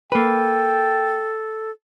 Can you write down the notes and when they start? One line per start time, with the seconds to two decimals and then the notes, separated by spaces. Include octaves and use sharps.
0.12 A#3 A4 B4 G5